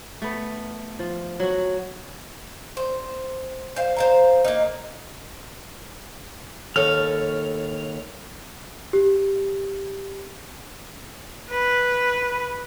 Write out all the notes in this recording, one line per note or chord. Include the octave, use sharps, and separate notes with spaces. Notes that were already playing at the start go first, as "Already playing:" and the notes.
A3 B3
F3
F#3 F#4
C5
C5 F5
C5 F5 A#5
A#3 D#4
D#2 A4 C#5 F6
G4
B4